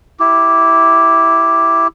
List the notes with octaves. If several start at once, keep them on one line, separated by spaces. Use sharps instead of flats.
E4 G4